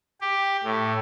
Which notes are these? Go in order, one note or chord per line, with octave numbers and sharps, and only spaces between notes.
G4
A2